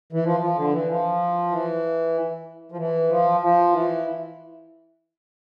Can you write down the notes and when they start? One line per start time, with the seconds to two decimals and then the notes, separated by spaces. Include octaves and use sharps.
0.13 E3
0.24 F3
0.40 F3
0.56 D3
0.72 E3
0.87 F3
1.51 E3
2.72 F3
2.78 E3
3.09 F3
3.41 F3
3.73 E3